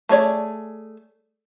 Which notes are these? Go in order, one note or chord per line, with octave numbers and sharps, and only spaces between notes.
A3 G#4 C#5 D5